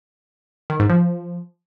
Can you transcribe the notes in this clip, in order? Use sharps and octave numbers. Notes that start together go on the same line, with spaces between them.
D#3
G#2
F3